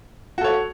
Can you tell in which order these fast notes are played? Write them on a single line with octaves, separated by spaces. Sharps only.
F#4 A4 C#5